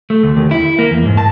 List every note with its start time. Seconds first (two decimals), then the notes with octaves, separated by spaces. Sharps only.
0.10 A3
0.23 D2
0.37 D#2
0.51 E4
0.79 A#3
0.91 E2
1.05 G#2
1.17 A5